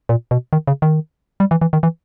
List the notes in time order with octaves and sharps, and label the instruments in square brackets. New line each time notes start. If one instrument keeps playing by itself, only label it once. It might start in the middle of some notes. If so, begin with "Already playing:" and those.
[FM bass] A#2
B2
D#3
C#3
D#3
G3
E3
E3
D#3
E3